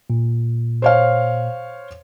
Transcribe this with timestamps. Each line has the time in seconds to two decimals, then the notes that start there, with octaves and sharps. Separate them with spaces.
0.10 A#2
0.82 C5 C#5 F5